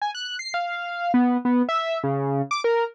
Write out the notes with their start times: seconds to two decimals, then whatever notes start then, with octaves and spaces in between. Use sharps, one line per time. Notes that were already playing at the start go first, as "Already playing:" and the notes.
0.02 G#5
0.15 F#6
0.39 C7
0.54 F5
1.14 B3
1.45 B3
1.69 E5
2.04 C#3
2.51 D6
2.64 A#4